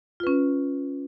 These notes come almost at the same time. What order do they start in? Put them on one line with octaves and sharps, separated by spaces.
F4 B4 C#4